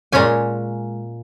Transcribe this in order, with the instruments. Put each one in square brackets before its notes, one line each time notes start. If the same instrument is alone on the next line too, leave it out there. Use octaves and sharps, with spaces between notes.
[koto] A#2 G#3 C#4 G#5